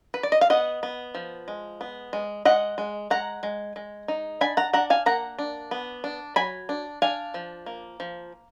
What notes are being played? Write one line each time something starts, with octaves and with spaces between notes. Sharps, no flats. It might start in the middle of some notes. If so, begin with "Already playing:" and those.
B4
D5
D#5
F5
B3 D#5 F#5
B3
F3
G#3
B3
G#3
G#3 D#5 F#5
G#3
G#3 F#5 A#5
G#3
G#3
D#4
D4 G#5 B5
F#5 A#5
D4 F#5 A#5
F5 G#5
A#3 F#5 A#5
D4
B3
D4
F#3 G#5 B5
D4
D4 F5 G#5
F3
A#3
F3